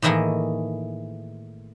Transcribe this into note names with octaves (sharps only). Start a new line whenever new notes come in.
A2 D#3 E3 A3 A#3 G#4